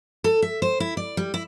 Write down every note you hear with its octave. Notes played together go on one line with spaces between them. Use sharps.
A4
E5
C5
E4
D5
G3
E4